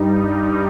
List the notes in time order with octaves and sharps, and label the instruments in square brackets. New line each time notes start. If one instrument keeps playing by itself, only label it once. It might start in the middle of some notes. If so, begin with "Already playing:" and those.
Already playing: [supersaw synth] G2 G3 D#4